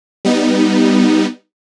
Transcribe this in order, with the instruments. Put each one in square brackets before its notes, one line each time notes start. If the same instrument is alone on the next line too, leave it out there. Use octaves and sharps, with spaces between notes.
[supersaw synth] G3 B3 D#4